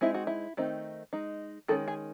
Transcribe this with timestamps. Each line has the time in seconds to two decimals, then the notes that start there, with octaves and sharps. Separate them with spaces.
0.01 G#3 C4 D#4 E4
0.14 F#4
0.27 E4
0.57 D#3 A3 C4 D#4
1.13 G#3 D#4
1.68 D#3 G#3 C#4 A4
1.88 G#4